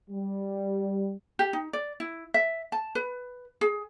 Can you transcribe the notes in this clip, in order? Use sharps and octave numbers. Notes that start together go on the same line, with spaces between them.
G3
G4
D#4
D5
E4
E5
A5
B4
G#4